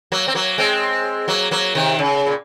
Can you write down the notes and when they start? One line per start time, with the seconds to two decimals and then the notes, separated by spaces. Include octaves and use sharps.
0.12 F#3 A#3
0.28 C4
0.35 F#3 A#3
0.58 G#3 C4
1.28 F#3 A#3
1.51 F#3 A#3
1.75 C3 D#3
1.99 C#3
2.26 A#2